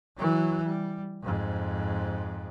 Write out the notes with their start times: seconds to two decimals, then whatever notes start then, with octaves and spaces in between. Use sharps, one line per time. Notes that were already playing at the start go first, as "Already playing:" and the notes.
0.17 E3 F#3
0.64 G3
1.22 F2 G#2